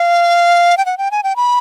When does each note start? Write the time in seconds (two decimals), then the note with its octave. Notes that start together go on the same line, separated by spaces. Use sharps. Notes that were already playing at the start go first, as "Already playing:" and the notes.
Already playing: F5
0.78 G5
0.86 F#5
0.98 G5
1.11 G#5
1.23 G5
1.36 B5